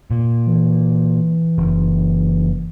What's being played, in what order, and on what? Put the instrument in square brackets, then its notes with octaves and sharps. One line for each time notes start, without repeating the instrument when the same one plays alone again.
[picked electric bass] A#2
[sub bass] E3
[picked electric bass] F#1